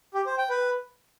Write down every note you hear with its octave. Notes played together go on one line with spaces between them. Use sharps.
G4
C5
G5
B4